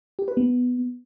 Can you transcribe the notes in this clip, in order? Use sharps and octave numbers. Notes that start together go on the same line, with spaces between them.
G4
B4
B3